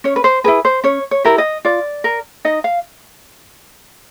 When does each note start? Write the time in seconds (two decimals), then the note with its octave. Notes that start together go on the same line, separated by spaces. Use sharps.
0.04 C#4 C#5
0.16 B4
0.24 C5
0.44 E4 G#4 B4
0.65 C5
0.84 C#4 C#5
1.11 C#5
1.25 E4 G4 A#4
1.38 D#5
1.65 F4 D5
2.04 A#4
2.45 D#4 D#5
2.64 F5